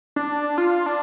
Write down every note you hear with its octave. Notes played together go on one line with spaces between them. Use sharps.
D4
F4
D4